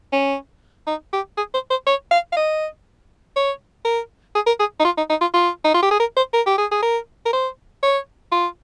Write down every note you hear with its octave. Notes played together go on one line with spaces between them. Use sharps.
C#4
D#4
G4
G#4
C5
C5
C#5
F5
F5
D#5
C#5
A#4
G#4
A#4
G#4
D#4
F4
D#4
D#4
F4
F4
D#4
F4
G4
G#4
A#4
C5
A#4
G4
G#4
G#4
A#4
A#4
C5
C#5
F4